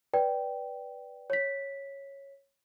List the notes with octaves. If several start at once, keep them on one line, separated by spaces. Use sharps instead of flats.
B4 D5 G5
C#5 B6